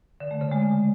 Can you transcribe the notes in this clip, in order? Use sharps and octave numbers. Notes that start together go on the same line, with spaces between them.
D3
A3
C#3
G#3